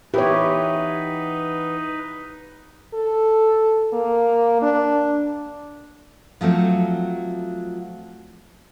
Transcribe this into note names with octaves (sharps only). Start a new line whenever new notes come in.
E3 B3 D#4 G4 B4 C#5
A4
A#3
D4
F3 F#3 A3 C4